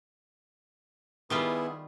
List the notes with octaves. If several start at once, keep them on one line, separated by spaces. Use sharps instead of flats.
D#3 G3 B3 E4 F4 G#4